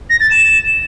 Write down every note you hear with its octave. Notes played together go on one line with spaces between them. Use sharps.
A#6
A6
E7